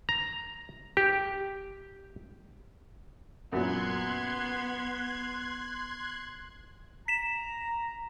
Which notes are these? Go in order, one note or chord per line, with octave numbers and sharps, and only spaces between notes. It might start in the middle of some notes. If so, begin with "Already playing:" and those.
A#5
G4
F#2 A#2 F#3 B3 C6 F#6 G#6
A#5 B6 E7